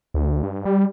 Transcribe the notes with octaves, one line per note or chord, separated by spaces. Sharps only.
D2
G2
G3